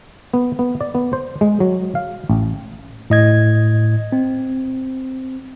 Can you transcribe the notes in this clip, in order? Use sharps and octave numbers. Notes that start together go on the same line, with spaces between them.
B3
B3
D5
B3
C5
G#3
F#3
F5
A1
A2 D#5 G#6
C4